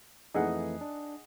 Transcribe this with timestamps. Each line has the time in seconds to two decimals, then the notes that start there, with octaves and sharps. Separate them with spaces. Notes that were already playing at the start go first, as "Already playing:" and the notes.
0.34 F2 E3 A3 D#4 G#4 F#5
0.81 D4